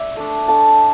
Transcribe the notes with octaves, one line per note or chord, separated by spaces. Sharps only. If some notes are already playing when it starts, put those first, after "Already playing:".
Already playing: D5 E5
A3 D4
A3 D4 A5